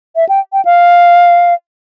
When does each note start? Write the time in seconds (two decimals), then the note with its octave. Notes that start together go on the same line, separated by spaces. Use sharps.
0.16 E5
0.29 G5
0.53 G5
0.65 F5